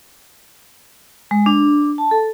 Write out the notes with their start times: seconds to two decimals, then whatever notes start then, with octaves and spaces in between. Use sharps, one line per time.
1.31 G#3
1.46 D4
1.98 A5
2.11 A4